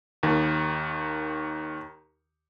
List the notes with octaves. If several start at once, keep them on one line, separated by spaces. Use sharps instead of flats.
D#2 D#3